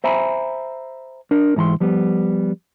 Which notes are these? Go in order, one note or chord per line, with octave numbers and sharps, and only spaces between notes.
C5 E5 G#5 A#5 B5
D4 A#4
G#2 E3 A#5 C6
F3 G3 B3